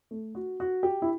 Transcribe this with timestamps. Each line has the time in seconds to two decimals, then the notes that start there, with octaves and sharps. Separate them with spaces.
0.11 A3
0.35 F#4
0.60 F#4
0.83 G4
1.02 E4